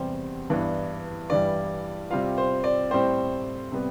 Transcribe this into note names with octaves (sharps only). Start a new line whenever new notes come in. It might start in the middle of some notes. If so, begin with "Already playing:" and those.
Already playing: E2 C3 G3 C5
G2 E3 B3 D4
G2 E3 G3 D5
C3 G3 C4 F4 F5
C5
D5
A2 G3 C4 C5
C3 G3 B3